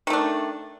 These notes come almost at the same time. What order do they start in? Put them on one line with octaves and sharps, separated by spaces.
D#3 A3 D4